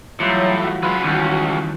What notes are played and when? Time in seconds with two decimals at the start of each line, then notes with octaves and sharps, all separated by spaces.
0.20 A2 E3 F#3 G3 A3 F4
0.61 F#4
0.83 C#3 F#3 G#3 F4 B4
1.03 C#2 D#3 E3 G3 C#4